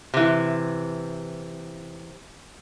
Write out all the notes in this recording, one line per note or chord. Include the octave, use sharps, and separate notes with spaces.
C3 E3